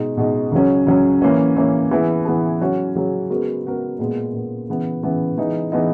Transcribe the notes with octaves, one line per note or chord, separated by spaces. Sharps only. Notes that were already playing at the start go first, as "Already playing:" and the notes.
Already playing: B2 G#3 D#4
B2 G#3 D#4
C#2 C#3 F#3 C#4
C#2 C#3 F#3 C#4
E3 A#3 C#4
E3 A#3 C#4
E3 B3 E4 G#4
E3 B3 E4 G#4
C#3 F#3 C#4 F#4
C#3 F#3 C#4 F#4
C#3 G#3 B3 F#4 A#4
C#3 G#3 B3 F#4 A#4
A#2 G#3 B3
A#2 G#3 B3
C#3 E3 B3
C#3 E3 B3
E3 G#3 B3 D#4
E3 G#3 B3 D#4